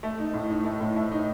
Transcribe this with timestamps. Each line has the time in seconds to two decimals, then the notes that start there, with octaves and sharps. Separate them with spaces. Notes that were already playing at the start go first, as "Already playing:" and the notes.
0.03 A3
0.19 D#4
0.34 A2
0.50 D#4
0.65 A3
0.81 A2
0.96 A3
1.12 D#4